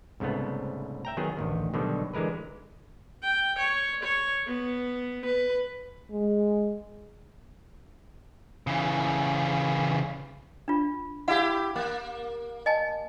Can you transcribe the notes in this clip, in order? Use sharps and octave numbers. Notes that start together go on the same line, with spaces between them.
C2 G#2 C#3 A3 B3
E5 G5 A#5
D#3 F#3 B3 G#4
A1 D2 D#3
B2 D3 D#3 F#3 G3
D3 E3 G#3 A#4 B4
G5
C#5
C#5
B3
B4
G#3
C#3 E3
D4 F4
E4 G4 F5 F#5
A#3
D#5 G#5 A5